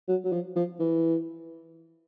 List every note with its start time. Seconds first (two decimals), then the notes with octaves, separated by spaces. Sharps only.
0.08 F#3
0.24 F#3
0.32 F3
0.56 F3
0.80 E3